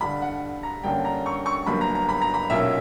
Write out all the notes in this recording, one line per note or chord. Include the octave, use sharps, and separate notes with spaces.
G2 D3 G3 B5
F#5
A#5
G2 D3 A#3 C#4 G5
A#5
C#6
C#6
G1 G2 F#3 A#3 B5
A#5
A#5
B5
A#5
B5
B1 A#2 A#3 C#4 E5